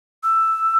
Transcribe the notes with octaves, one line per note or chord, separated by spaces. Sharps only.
E6